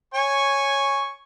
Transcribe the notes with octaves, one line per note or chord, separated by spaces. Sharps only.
C#5 G#5 C#6